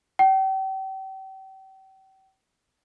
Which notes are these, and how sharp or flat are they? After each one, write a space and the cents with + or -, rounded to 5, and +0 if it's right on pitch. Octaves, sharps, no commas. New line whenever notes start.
G5 -40